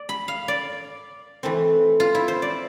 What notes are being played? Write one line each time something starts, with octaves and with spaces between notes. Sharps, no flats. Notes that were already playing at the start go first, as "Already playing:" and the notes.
Already playing: D5
B5
F5
D5
E3 A3 C4
F4
E4
C5
D5